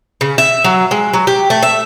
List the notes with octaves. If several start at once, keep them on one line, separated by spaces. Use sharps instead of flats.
C#3
E5
F#3
G#3
F#3
G4
A3
E5